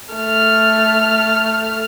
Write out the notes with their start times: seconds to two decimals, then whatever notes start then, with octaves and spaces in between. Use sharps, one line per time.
0.14 A3 F6